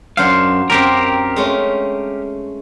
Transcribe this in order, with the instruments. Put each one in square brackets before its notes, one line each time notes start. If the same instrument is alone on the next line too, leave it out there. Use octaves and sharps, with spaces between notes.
[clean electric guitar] F#2 F5 [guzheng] D4 C5 F#5
[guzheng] F#2 A#3 C4 [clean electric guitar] G4 A#4
[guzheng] G#3 A3 C#4